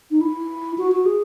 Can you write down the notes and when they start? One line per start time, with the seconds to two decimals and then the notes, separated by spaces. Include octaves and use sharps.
0.11 D#4
0.21 E4
0.78 F#4
0.92 F#4
1.06 G#4